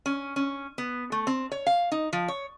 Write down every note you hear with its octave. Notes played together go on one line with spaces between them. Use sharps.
C#4
C#4
B3
A3
C4
C#5
F5
D#4
F3
C#5